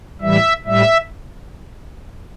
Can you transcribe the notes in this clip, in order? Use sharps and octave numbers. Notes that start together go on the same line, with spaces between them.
A2 E3 G3 E5
A2 G3 E5